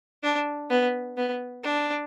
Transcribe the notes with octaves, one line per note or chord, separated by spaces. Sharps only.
D4
B3
B3
D4